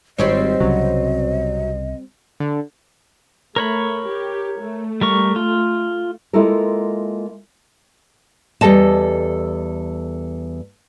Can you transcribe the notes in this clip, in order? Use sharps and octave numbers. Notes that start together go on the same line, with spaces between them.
G#1 G3 C4 C#5 D#5
C2 C#3 F#3
D3
A3 A#4 C#5 B5
G4
A3
G3 A#4 C#6
F4
G#3 A#3 E4 F4 A4 A#4
E2 G3 A4 D#5 A5